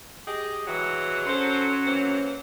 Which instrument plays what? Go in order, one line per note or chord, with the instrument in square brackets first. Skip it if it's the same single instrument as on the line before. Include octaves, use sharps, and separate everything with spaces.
[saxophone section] G4 G#4 D#5
[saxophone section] E3 G#3 F#4 [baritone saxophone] F#3
[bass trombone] C#4 [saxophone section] A4 C5
[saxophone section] E3 A#3 C5